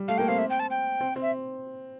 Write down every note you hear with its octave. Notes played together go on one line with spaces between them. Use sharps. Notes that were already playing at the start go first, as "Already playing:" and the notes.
Already playing: G3
A3 F5
A#3 G5
C4 F5
E5
G5
A5
G5
C4
C4
E5